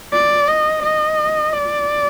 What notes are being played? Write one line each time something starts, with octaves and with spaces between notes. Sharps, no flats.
D5
D#5
D#5
D5